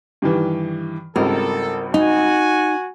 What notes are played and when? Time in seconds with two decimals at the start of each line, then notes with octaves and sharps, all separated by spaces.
0.22 G2 D#3 E3
1.16 G#1 C#2 G3 A4 A#4
1.94 D#4 F#4 G#5